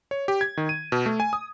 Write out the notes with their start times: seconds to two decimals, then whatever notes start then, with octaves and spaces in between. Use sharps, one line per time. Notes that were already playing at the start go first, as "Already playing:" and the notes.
0.11 C#5
0.28 G4
0.41 G#6
0.57 D#3
0.69 D#7
0.92 B2
1.06 A3
1.20 G#5
1.33 D#6